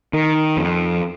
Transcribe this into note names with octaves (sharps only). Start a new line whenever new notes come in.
D#3
F2